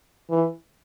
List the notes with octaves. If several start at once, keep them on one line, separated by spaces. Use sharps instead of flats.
E3